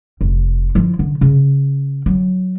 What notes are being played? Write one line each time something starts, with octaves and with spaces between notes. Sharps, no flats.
F1
F3 E4
D3
C#3
F#3